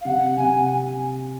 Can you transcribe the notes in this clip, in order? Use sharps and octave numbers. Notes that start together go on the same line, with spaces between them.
F5
C3 F#5
C3 G#5